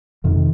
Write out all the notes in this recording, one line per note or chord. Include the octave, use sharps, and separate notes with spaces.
F2 C3 D#3